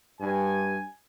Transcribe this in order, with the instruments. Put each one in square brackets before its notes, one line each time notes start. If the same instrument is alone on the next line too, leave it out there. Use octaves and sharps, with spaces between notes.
[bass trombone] G2 [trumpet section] G#5